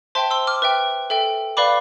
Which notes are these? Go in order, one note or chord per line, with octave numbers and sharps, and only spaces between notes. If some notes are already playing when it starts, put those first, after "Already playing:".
C5 E5 G5 A5 C6
C6 E6
D6 F6
B4 E5 G5
A4 E5 G5
B4 D5 F5 B5 D6